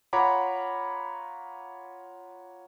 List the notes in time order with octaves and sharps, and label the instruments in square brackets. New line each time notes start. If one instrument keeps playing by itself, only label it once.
[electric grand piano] F4 C#5 F#5 A#5 B5 D6